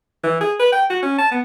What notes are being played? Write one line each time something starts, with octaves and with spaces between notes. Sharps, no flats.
E3
G#4
B4
G5
F#4
C#4
A5
B3